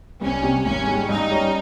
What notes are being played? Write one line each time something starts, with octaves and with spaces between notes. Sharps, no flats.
C2 C#4
C3 G3
G#1 C#4
G#2 G3
G2 D#4
G3 C#4